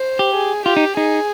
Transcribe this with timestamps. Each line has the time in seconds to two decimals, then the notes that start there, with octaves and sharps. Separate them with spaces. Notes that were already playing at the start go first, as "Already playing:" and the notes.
Already playing: C5
0.19 G4
0.35 G#4
0.66 F4 G4
0.76 D#4
0.97 D#4 G#4